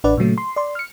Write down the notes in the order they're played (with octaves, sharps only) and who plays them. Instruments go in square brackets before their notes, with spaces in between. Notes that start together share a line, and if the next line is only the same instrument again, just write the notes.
[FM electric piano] A1 D4 B4 D5 F#5
A#2 C#3 F#3 A3
C6
D5 C6
F6 C#7